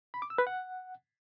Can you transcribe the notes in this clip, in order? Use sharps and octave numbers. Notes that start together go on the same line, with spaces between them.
B5
D6
E6
B4
F#5